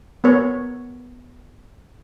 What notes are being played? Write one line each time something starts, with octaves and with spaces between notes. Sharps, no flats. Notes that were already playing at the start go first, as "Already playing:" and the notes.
B3 A#4 C#5